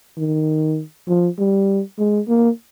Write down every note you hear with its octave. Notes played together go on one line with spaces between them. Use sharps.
D#3
F3
G3
G#3
A#3